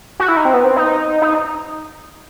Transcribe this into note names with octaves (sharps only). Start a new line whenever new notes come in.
F#4
E4
D#4
C4
B3
C4
D#4
D#4